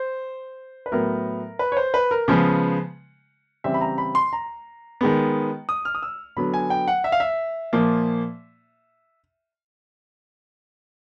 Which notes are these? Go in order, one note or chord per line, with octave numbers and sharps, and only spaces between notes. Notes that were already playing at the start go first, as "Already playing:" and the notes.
Already playing: C5
B4
A2 F#3 B3 A#4
B4
C#5
C5
B4
A#4
C#3 F3 G#3 B3
C#3 E3 G3 C4 E5
B5
A#5
B5
C6
A#5
D#3 G#3 B3
D#6
F6
D#6
E6
D3 F#3 B3 B5
G#5
G5
F#5
E5
F5
E5
A#2 F3 A#3